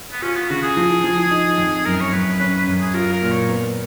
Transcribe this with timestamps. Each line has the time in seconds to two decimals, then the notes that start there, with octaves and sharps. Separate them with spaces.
0.11 B3
0.22 C#4 F4
0.35 B3
0.50 C#3 F#4
0.63 G#4
0.77 F3
1.04 F3
1.31 D#4
1.58 F2
1.85 F#2 A#4
2.01 C#5
2.13 F#2 B4
2.40 C#4 B4
2.54 B4
2.67 F#2
2.81 G#4
2.94 F4 A#4
3.13 A#4
3.22 A#2
3.31 C#5
3.49 B3